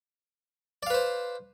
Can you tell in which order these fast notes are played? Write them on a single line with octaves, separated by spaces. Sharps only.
D5 F5 B4 C5